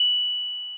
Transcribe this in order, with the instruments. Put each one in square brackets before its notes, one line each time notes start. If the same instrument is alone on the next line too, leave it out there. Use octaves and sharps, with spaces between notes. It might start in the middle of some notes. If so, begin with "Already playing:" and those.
Already playing: [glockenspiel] F#7